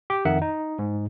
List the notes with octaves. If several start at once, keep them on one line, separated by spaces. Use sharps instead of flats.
G4
F2 D#3 E5 F#5
D#4
G#2